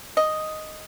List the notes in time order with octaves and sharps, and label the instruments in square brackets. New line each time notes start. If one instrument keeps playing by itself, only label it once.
[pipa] D#5